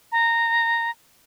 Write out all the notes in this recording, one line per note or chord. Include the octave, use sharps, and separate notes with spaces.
A#5